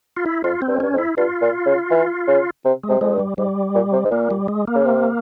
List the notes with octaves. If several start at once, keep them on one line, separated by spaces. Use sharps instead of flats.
F4
E4
F2 F4
C4
G2
F2
G2 C#4
F2
E4
G2 F4
A#2
C#3
E3
C#3
C3
G#3
C3
F2 G#3
G2
G3
G#2 G3
A#2
C3
G#2
A#2 A#3
G3
G#3
A#3
C#3
C3